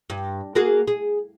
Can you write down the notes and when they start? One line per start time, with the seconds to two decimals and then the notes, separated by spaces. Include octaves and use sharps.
0.10 G2
0.55 A#3 F#4 G#4
0.87 G#4